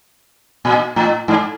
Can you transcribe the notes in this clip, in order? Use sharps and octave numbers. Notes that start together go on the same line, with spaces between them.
A#2
A2
G#2